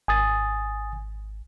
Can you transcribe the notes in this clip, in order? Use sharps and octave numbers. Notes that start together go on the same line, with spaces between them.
G#1 G#5 D#6 A6